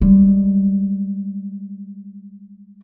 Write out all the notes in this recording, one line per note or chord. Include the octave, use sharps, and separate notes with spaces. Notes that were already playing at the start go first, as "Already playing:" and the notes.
G3 G#3